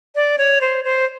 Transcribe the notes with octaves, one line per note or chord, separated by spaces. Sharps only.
D5
C#5
C5
C5